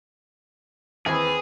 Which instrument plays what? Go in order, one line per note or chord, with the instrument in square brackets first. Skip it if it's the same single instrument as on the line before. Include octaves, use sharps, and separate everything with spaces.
[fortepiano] D#2 E3 [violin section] C4 B4 [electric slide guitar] G#4